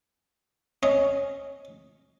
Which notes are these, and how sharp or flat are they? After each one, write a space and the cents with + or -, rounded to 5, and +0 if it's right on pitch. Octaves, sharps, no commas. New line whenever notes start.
C#4 +0 D#5 +0